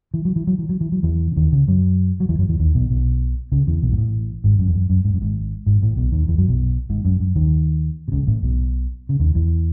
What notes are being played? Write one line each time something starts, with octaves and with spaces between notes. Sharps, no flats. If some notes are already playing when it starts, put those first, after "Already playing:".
E3
F#3
E3
F#3
E3
F#3
E3
F#3
E2 E3
C#3
D#2 D#3
C#2 C#3
F#2 F#3
F#3
E2 E3
F#2 F#3
E2 E3
D#2 D#3
B1 B2
B1 B2
C#2 C#3
E2 E3
B1 B2
G#2
A1 A2
G#1 G#2
F#2
E2
F#2
F#2
G#2
F#2
G#1 G#2
G#1 G#2
A1 A2
B1 B2
D#2 D#3
E2 E3
F#2 F#3
B1 B2
G#1 G#2
F#2
F#2
D#2 D#3
B2
C#2 C#3
A1 A2
B1 B2
C#3
D#2 D#3
E2 E3